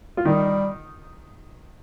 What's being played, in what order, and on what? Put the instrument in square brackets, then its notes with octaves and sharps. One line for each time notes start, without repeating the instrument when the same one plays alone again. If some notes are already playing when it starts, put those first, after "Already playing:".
[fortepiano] F4
[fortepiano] D#3 D#4 [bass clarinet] G3